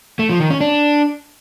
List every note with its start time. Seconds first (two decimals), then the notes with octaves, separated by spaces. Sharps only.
0.19 A3
0.30 F3
0.40 D#3
0.50 C#4
0.61 D4